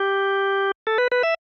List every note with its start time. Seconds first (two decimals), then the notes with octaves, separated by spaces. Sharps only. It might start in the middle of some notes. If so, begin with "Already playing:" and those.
Already playing: G4
0.87 A4
0.98 B4
1.12 B4
1.23 E5